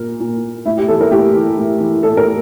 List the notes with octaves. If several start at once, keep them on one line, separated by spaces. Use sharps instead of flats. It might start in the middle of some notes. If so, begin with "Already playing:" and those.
Already playing: A#2 A#4
A#2
A2 E4
G4
E3 A4
A#4
A2 G4
E3
A2
E3
A2 A4
A#4